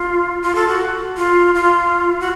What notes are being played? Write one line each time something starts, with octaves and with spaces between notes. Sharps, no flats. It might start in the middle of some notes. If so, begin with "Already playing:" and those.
Already playing: F4
F4
A4
F#4
F4
F4
F#4